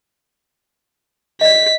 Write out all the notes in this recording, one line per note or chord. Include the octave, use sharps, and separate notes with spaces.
D5 D#5 B6